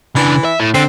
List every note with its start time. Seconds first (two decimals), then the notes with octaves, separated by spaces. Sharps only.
0.16 C#3 E3 D4
0.45 E5
0.60 A2
0.74 D3 C4